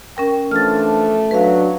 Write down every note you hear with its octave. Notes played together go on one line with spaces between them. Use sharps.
C#4 A#4 G5
E3 F3 A3 D4 F6 A6
F#3 D4 B4 F5